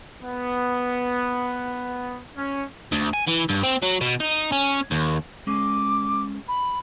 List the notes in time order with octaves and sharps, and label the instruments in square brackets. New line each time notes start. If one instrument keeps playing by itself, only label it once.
[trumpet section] B3
C#4
[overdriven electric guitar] D2
G#5
E3
G2
C4
F#3
B2
D#4
C#4
D#2
[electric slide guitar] G#3 C#4 [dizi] D6
[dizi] B5